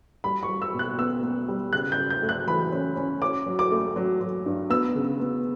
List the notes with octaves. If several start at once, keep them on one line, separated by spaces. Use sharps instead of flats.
G3 B5
C#6
G3
E6
B2
F#6
B3 E6
B3
G3
C#3 F#6
G6
C#3
G6
A3
F#6
E3 B5
C#4
C#4
C#4 D6
F#3
D6
A3
F#3
F#3
G2
B3 E6
C#3
B3